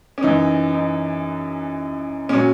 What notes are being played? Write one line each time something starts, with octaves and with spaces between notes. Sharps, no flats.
C#4
F#2 E3 D#4
D#4
A#2 F#3 C#4